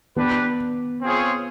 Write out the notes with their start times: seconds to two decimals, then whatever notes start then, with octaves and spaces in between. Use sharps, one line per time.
0.16 B3 D4 G4 B4
1.02 C4 F4 G#4 C#5